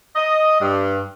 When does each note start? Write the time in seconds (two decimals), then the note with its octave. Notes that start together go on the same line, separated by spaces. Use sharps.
0.16 D#5
0.61 G2